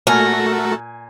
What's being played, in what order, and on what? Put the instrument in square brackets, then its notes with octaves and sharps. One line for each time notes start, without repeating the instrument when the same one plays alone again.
[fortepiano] A#2 G#5 [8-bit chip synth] A3 F#4 A4 [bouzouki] A#4